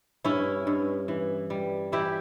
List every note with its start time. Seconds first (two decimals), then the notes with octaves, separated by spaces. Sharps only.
0.25 G2 C#4 E4
0.67 G2
1.08 E3
1.50 G3
1.92 E3 E4 G4